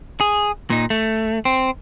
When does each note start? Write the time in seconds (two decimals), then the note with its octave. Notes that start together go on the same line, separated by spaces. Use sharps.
0.21 G#4
0.70 A#2 D#4
0.90 A3
1.45 C4